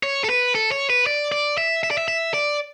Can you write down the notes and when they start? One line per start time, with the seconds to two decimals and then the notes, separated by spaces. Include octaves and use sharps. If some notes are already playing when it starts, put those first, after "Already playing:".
0.03 C#5
0.24 A4
0.29 B4
0.55 A4
0.72 C#5
0.90 B4
1.06 D5
1.32 D5
1.58 E5
1.83 E5
1.91 D5
1.98 E5
2.08 E5
2.34 D5